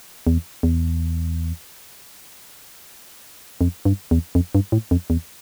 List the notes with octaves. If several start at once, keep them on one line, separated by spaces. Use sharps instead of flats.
E2
E2
F2
G2
E2
F2
G2
A2
F2
E2